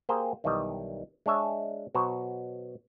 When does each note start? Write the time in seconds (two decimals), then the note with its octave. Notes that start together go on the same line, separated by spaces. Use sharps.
0.09 A#3 G4 G#4 C5 G5 A#5
0.44 B1 D#3 E3 G3 D#5
1.26 G#3 D4 C#5 E5
1.95 B2 F#3 F#4 C5 A#5